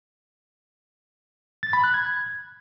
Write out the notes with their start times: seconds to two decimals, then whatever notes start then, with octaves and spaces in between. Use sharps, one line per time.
1.63 A6
1.73 B5
1.84 F#6
1.94 G#6